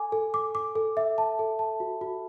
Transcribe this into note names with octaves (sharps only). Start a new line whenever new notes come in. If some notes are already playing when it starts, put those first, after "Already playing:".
Already playing: A4 G#5 D6
A4
D6
D6
A4
E5
A5
A4
A5
F#4
F#4